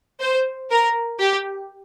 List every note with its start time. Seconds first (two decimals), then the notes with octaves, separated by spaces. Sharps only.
0.21 C5
0.70 A#4
1.19 G4